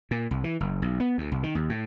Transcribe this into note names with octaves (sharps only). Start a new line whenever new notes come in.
A#2
C2
E3
F#1
B1
B3
D2
C2
D#3
D#2
A2